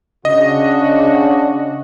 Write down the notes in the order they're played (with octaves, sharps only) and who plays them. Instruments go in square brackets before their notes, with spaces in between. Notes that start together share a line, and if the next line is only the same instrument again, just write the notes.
[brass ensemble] C#3 D4 F#4 [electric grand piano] D#5